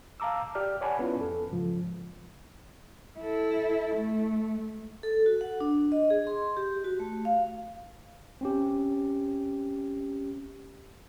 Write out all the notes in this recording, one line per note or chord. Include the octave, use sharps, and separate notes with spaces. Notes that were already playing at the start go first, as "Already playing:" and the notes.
F5 A5 A#5 D6 E6
G4 D5 F6
C#5 D5 F#5 G#5 A5 B5
B3 C#4 E4 F4 B4
F2 A4
G#2 C#3 F3
E4 A4
A3
A4
F#4
F#5
D4
D#5
G#4
C6
G4
F#4
A3
F5
C4 C#4 G4